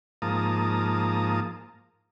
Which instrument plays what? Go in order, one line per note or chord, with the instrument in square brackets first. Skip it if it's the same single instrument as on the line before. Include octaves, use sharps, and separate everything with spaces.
[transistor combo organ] G#2 F3 A#3 A5 A#5 D#6